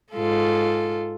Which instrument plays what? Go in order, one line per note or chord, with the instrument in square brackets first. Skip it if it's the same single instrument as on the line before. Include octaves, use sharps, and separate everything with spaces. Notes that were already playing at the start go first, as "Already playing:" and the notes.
[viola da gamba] G#2 F4 A4